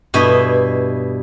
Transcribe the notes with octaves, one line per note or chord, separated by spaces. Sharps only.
G2 B2 E4 D#5 E5